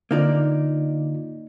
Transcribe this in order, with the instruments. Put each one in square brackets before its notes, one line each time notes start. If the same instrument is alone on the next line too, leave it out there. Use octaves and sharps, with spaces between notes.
[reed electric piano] D3 F4 [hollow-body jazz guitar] A#3 D#4 D5